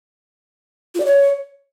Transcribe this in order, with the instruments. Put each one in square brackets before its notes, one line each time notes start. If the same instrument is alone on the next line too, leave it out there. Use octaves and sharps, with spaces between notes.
[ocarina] F4
D5
C#5